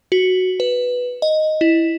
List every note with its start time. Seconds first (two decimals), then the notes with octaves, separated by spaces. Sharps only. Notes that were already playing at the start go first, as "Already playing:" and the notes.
0.12 F#4
0.60 B4
1.22 D#5
1.61 E4